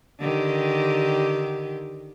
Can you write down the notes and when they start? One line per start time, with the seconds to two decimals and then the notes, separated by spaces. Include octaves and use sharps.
0.20 D3 D#3 G4